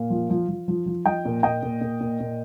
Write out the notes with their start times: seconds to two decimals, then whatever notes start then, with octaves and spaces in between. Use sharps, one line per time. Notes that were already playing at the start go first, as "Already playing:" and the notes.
Already playing: A#2 F5
0.10 F3
0.30 F3
0.48 F3
0.68 F3
0.86 F3
1.06 F3 D#5 G5
1.25 A#2
1.43 A#2 D#5 G5
1.63 A#2
1.81 A#2
2.01 A#2
2.20 A#2